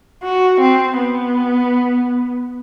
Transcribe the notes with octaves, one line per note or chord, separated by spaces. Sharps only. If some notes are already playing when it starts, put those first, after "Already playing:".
F#4
C4
B3